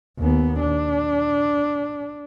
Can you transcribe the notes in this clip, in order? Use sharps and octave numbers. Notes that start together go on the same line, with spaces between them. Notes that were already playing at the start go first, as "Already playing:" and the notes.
D#2 B3
D4